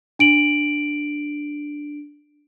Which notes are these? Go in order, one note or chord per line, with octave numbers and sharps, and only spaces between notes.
D4 D7 F#7